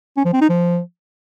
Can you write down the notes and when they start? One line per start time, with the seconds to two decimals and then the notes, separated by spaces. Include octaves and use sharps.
0.17 C#4
0.25 F3
0.33 C4
0.41 D#4
0.49 F3